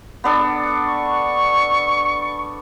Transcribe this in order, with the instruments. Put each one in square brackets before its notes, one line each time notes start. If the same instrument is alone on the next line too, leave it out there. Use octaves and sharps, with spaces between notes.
[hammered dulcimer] B3 D4 A4
[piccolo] C#6